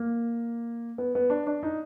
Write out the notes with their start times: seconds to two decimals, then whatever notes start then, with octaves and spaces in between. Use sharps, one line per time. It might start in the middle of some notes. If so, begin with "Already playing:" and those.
Already playing: A#3
0.98 B3
1.15 B3
1.30 D4
1.47 D4
1.63 D#4